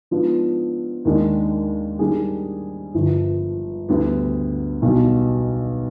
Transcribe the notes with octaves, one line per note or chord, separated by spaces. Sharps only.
G#2 F3 B3 D4 F4
D#2 D#3 G#3 D4
G#2 G3 D4 G#4
G1 G2 F3
D2 D3 G3 B3
B1 B2 G3